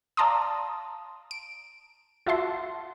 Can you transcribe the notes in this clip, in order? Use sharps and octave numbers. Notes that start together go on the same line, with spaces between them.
D5 F5 A5 A#5 C6 D#6
D7
F4 F#4 E5 A5 C6